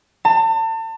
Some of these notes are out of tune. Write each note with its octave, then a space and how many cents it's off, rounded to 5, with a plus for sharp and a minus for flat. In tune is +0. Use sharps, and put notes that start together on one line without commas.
A5 +35